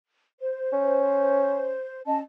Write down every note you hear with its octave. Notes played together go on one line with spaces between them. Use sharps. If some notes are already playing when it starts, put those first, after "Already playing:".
C5
C#4
C#4 D#5 A5